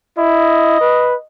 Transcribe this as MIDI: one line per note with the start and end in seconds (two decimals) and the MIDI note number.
0.18 0.76 64
0.18 1.25 75
0.81 1.15 71